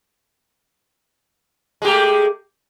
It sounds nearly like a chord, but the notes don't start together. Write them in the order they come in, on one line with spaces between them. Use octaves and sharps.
G#3 G4 A3